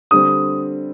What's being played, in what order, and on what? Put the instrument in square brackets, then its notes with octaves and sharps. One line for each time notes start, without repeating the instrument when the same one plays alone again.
[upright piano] D3 G3 C4 [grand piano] D#6